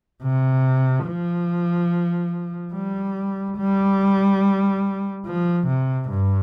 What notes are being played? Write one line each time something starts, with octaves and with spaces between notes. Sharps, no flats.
C3
F3
G3
G3
F3
C3
G2